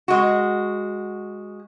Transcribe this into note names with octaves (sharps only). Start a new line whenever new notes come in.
G#3 F#4